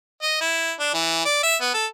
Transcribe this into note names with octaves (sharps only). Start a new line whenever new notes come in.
D#5
E4
D4
E3
D5
E5
B3
A4